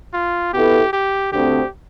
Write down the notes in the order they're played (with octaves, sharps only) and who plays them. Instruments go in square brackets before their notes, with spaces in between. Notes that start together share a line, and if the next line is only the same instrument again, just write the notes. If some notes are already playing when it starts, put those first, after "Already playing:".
[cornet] F4
[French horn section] B2 B3 E4 A4 [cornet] G4
[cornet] G4
[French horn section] D2 D3 A3 C4 [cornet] G4